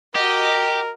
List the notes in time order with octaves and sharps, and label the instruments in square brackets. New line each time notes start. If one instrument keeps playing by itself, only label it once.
[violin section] F#4 D#5 [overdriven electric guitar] G4 [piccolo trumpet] A#4